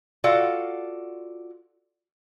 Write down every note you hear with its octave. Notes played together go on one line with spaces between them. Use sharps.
F4 F#4 A4 D5 F5 F#5